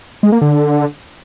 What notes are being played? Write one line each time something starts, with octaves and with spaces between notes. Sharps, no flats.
G#3
A#3
D3